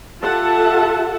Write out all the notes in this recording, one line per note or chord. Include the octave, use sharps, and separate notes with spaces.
F4 G4 A4 E5 F#5 A5